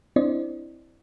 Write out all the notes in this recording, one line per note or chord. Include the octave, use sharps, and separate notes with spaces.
C4 D4 E4 C5 D5 D#5